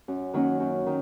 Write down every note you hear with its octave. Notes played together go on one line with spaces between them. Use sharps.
F#2
D#3 F#3 A#3 C#4
F#2
D#3